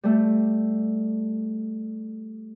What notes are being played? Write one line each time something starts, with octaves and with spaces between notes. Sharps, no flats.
G3 A3